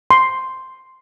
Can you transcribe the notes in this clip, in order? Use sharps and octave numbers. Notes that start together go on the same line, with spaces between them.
C6